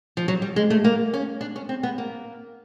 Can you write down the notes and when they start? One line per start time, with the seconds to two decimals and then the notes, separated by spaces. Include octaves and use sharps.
0.17 F3
0.28 F#3
0.42 G3
0.56 G#3
0.70 A3
0.84 A#3
1.14 C#4
1.41 D4
1.56 C#4
1.69 C4
1.83 B3
1.98 A#3